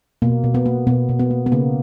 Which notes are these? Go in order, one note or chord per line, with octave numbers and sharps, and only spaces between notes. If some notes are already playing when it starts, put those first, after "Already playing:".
B2 A#3
B2
B3
A#3
B2 B3
B2
B3
A#3
B3
C#3 A#3